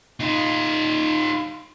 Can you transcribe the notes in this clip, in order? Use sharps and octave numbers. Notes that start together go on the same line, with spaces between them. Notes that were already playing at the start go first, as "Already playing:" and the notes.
D#4 F4